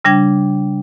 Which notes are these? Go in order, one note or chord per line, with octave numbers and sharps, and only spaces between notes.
C#3 G3 D4 G5 G#6